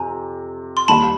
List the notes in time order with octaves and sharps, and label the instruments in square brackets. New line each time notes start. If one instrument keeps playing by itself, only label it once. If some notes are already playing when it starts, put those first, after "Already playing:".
Already playing: [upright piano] F2 C3 [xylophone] G#5 A#5
[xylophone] C6
[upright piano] D#2 D#3 G3 [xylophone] A5 B5